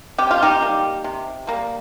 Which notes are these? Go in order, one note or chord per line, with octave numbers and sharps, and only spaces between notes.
C3 G4
F4
D#4 G4
G3 A#3
C3
G3 A#3